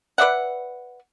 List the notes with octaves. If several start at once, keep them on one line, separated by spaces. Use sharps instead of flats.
B4 D5 E5 F#5